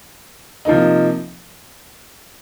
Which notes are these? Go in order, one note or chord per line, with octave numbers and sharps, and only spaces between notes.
C3 F3 A#3 D#4